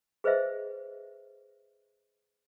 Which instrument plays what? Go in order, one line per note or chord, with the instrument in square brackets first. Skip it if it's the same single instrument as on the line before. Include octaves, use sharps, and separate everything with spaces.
[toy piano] G#4 B4 C5 D#5 E5